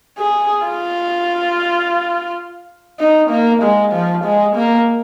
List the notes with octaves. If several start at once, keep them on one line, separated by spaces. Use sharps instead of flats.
G#4
F4
D#4
A#3
G#3
F3
G#3
A#3